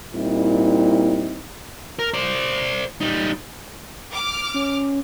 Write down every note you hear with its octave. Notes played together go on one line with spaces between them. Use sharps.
A#2 G3 C4 D#4 E4
A#4
C5 D5
G3 D#4
D6 F6
C#4